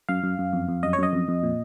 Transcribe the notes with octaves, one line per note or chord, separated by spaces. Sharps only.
F#2 F5
F#2
F#2
F2
F2
F#2 D#5
C#5
F#2 D#5
F2
F2
A#2